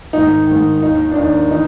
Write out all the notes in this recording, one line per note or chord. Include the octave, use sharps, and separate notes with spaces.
G#2 D#3 D#4
G#2 D#3
D#2 D#3 D#4
D4
D#2 D#3 D#4
E3 D#4